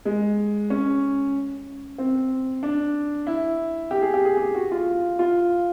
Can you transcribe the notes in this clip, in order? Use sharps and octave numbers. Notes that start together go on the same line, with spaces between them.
G#3
C#4
C4
D4
E4
G4
G#4
G4
G#4
G4
F#4
F4
F4